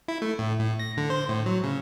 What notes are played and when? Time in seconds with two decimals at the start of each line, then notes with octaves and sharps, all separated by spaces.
0.08 E4
0.22 A3
0.39 A2
0.59 A2
0.80 A#6
0.97 D3
1.10 C5
1.29 A2
1.46 F#3
1.64 C#3